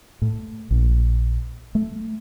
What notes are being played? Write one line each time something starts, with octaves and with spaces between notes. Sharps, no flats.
A2
A#1
A3